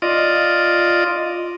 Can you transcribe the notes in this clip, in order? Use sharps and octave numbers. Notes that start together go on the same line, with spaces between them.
F4 D5 D#5